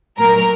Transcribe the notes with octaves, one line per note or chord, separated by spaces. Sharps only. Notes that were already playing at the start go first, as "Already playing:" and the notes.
A#2 F#3 A#4